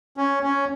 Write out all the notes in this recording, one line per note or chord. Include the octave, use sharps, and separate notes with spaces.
C#4
C#4